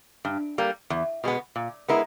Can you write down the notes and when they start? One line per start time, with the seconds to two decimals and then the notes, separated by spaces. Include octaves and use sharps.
0.25 G2
0.58 G3 A#3
0.90 E2
1.24 B2 G#3 B3
1.56 A#2
1.88 G#3 B3 E4 A#4